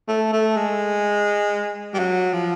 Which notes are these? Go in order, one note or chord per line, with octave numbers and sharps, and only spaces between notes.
A3
A3
G#3
G3
F#3
F3